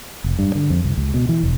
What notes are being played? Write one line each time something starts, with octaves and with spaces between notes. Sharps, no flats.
F1
G2
D3
F2
C2
C#2
B2
E3
E1